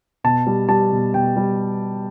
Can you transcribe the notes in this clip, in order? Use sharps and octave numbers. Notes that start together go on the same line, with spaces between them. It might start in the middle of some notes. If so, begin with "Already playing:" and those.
B2 A5
G3
G3 A5
B2
B2 G5
G3